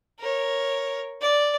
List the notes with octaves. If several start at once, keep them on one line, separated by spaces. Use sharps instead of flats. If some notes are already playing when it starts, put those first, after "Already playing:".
A#4 C#5
D5